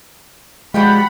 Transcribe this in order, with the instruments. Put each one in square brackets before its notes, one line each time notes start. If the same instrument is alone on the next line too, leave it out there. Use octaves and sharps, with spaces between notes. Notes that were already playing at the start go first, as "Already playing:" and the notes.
[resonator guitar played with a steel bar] B2 F3 G3 [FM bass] G#3 [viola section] F#5 B5